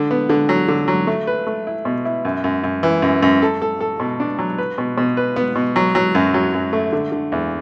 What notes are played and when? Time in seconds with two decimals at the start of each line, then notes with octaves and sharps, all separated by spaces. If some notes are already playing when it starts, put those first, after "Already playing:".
Already playing: D3
0.11 B3
0.29 D3
0.49 F#3
0.68 D3
0.88 F#3
1.07 A3
1.27 B4
1.47 A3
1.67 E4
1.85 B2
2.05 E4
2.25 F#2
2.44 F#2
2.64 F#2
2.83 E3
3.02 F#2
3.22 F#2
3.42 A4
3.62 A4
3.81 A4
4.00 B2
4.20 D4
4.39 F#3
4.58 B4
4.78 B2
4.98 B2
5.17 B4
5.36 B3
5.56 B2
5.76 F#3
5.95 F#3
6.15 F#2
6.34 F#3
6.54 F#2
6.73 A3
6.92 D3
7.12 D3
7.32 E2